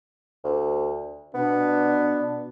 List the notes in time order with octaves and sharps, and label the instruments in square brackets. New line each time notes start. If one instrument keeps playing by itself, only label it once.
[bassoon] D2
[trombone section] B2 D4 [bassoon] B3